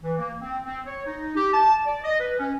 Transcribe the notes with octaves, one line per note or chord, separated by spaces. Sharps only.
E3
A#3
C4
C4
C#5
D#4
G4
A5
D5
D#5
B4
C#4